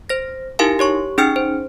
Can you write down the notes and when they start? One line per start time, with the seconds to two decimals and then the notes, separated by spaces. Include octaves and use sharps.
0.09 C5 A#6
0.59 D#4 E4 G4 A#4 F5 G#5
0.79 G4 C#5 C#6
1.18 C#4 D#4 G#4 G5 F6 C#7
1.36 C5